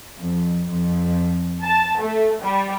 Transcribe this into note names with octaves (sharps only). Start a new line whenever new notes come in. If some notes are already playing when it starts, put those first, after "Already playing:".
F2
F2
A5
A3
G3